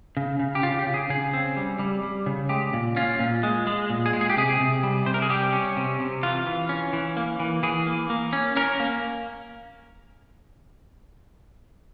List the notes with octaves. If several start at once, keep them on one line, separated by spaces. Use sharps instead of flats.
C#3
C#3
G4
C#3 F4
G4
C#3
G#4
C#3 G#4
C4
G3
G3
G3
C#3
G#3 G4
A#2
C#4 F4
A#2
G#3
G#3
A#2
G#4
G#3
G#4
G4
C3 G#4
C3
G3
C3 C5
A#4
G#4
G3 G4
C#4
C3
C3
E3 F4
E3
C#4
E3
A#3
E3
E3 G#4
A#3
A#3
C#4
C#4 A#4
A#3